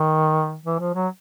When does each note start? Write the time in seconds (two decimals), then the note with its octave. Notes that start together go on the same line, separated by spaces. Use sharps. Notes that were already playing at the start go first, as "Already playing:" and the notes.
Already playing: D#3
0.66 E3
0.79 F3
0.94 F#3